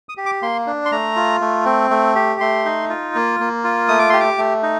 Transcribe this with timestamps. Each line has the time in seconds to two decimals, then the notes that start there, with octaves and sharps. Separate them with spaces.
0.09 D#6
0.17 G4
0.26 D6
0.42 A#3 C6
0.67 D4
0.85 C6
0.92 A3 A#5
1.16 F4
1.41 A3
1.65 C4
1.90 A3
2.15 G4
2.41 A3 C6
2.65 D#4
2.89 F4
3.15 A#3
3.40 A#3
3.64 F4
3.88 A3 D#6
3.99 D6
4.10 G4 C6
4.20 D6
4.38 A3
4.63 D#4